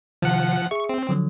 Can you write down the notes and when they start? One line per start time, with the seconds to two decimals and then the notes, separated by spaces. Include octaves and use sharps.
0.22 C3 D#3 F3 F#5
0.71 G#4 E5 C#6
0.89 C4
1.09 D3 F3 F#3